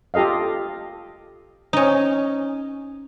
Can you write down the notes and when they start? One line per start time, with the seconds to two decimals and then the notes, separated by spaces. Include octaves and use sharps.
0.14 F4 G4 A4 D#5 F5
1.73 C#4 D#4